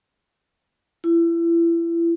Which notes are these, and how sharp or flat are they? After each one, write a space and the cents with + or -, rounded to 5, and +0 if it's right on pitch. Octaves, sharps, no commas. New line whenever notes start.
E4 +30